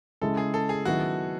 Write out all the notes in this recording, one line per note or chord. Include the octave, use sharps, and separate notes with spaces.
C#3 G#3 C#4 E4 A4
G#4
A4
G#4
D#3 F#3 B3 E4 F#4